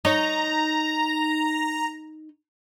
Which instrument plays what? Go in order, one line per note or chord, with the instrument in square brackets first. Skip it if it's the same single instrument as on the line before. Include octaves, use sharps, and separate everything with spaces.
[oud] D#4 C#5 [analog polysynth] A#5